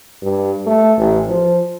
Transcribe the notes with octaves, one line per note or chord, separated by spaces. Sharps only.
G2
A3
A1
F3